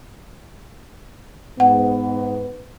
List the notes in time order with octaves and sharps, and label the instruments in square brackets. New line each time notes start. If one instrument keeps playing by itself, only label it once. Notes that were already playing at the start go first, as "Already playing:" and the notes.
[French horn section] G#2 B3 [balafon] F#5